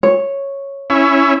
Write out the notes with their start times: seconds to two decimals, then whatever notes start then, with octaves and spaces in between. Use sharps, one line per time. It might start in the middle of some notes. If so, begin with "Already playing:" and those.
0.03 C#5
0.90 C#4 E4